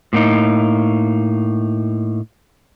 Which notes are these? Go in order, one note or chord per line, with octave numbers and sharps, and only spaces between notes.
A2 A#3 D#4